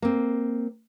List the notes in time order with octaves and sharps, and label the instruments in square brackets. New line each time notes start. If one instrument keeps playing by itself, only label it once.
[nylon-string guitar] A#3 C4